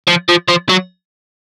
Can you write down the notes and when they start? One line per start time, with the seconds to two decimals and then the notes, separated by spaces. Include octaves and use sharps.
0.08 F3
0.29 F3
0.49 F3
0.70 F#3